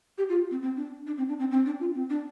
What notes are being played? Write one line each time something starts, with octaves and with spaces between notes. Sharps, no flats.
G4
F4
C4
C4
D4
D4
C4
D4
C4
C4
D4
F4
C4
D4